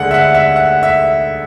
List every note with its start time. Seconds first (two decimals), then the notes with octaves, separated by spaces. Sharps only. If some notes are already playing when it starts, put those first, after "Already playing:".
Already playing: D2 D3 G#3 F#5
0.11 E5
0.14 F#5
0.34 E5
0.56 F#5
0.83 E5